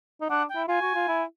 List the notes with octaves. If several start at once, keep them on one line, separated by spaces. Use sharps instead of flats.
D#4
D4 F#5
G5
E4
F4 G#5
F#4
F4
E4